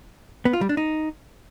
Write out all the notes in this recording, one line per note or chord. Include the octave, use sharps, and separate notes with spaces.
B3
F4
G3
D4
D#4